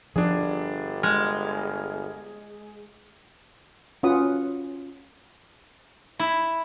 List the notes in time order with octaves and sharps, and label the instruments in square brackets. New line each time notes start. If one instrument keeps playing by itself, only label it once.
[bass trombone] G1 [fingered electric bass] F3 [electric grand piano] D4 G#4
[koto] G#3 [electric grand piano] F6
[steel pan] C#4 F4 F#4 B4 F#5 D#6
[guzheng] E4